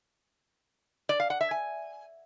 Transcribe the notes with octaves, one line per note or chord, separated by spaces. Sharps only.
D5
F5
F#5
E5
G#5